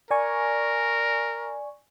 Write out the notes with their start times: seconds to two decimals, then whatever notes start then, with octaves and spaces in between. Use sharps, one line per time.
0.11 A#4 D5 G#5 C#6